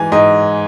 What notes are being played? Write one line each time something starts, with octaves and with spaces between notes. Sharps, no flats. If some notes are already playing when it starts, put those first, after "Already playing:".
Already playing: G#2 E3 G#5
G#2 D#5